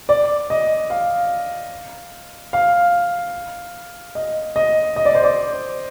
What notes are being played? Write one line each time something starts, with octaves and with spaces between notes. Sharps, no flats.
D5
D#5
F5
F5
D#5
D#5
D#5
D5
C5
D5